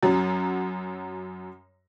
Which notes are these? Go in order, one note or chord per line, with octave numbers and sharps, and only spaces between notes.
F#2 F#3